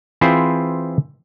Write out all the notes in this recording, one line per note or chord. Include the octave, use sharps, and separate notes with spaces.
E3 C4 E4 F4 G#4 C5